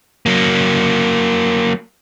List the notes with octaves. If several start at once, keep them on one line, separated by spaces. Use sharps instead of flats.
F#3 A#3